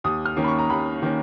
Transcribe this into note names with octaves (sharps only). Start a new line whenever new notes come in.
D#2 D#6
F6
D#3 A#3 C#4
B5
C#6
A#5
D#2 B5
D#3 A#3 C#4